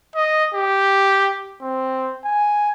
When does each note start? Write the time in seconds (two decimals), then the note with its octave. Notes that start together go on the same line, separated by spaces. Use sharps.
0.15 D#5
0.54 G4
1.62 C4
2.24 G#5